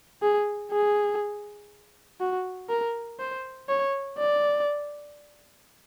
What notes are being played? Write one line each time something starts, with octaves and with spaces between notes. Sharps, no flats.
G#4
G#4
F#4
A#4
C5
C#5
D5